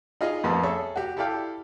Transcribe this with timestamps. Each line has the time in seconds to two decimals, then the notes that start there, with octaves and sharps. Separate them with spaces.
0.21 D#4 F4 G#4 D#5
0.43 A1 F2 A#3 B3 A5
0.63 G#4 A4 C#5 E5
0.96 F#4 G4
1.17 E4 G4 A4 D5 F5 G5